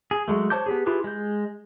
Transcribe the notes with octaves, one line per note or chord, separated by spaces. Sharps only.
G#4
F#3 G#3 A3
C5 C#5 A5 D6 G6
B3 G4 G#4
E4 F4 G4 G#4 B4
G#3 G6